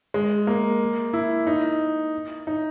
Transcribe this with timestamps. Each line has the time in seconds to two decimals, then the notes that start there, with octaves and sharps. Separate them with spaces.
0.14 G#3
0.47 A#3
1.13 E4
1.47 D#4
2.47 D#4